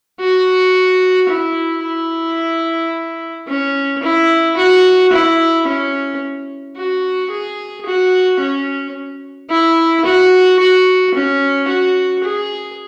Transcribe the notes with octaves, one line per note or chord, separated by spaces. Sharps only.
F#4
E4
E4
C#4
E4
F#4
E4
C#4
F#4
G#4
F#4
C#4
E4
F#4
F#4
C#4
F#4
G#4